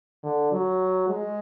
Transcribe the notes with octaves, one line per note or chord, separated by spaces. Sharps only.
D3
F#3
G#3